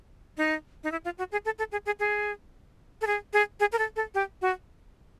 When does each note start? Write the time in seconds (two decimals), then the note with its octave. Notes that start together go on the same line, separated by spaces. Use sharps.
0.38 D#4
0.84 D#4
0.92 E4
1.05 F4
1.18 F#4
1.32 G#4
1.45 A4
1.59 A4
1.72 G#4
1.86 G#4
2.00 G#4
3.01 A4
3.07 G#4
3.33 G#4
3.60 G#4
3.72 A#4
3.79 A4
3.96 A4
4.14 G4
4.42 F#4